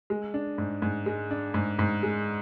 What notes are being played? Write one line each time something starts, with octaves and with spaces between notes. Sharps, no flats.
G#3
D4
G#2
G#2
G#3
D4
G#2
G#2
G#3